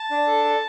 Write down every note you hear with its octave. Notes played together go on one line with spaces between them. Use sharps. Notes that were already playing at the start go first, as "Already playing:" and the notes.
Already playing: A5
D4
A4
A4